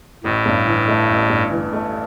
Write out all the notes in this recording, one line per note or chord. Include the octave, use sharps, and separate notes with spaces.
A1 A2
G2
E3
A3
A1
G2
E3
A3